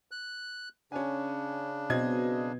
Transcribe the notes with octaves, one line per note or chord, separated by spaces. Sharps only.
F#6
C#3 C#4 D4 G#5
B2 C4 D#5 G#6